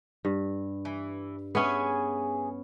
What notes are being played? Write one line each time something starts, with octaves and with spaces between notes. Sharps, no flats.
G2
E3
B3 C#4 G#4 E5 G#5